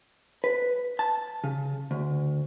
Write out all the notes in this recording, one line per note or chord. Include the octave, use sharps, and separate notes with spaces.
B4
A5
C#3
D2